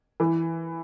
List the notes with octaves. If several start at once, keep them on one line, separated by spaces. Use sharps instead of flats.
E3